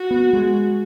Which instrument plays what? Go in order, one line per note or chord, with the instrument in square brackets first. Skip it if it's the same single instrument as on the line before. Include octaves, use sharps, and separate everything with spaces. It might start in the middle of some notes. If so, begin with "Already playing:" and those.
Already playing: [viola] F#4
[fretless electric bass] B3
G#3